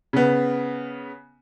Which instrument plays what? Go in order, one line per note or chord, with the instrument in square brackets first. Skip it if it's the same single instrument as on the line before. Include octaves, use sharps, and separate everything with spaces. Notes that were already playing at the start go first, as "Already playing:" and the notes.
[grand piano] C#3 B3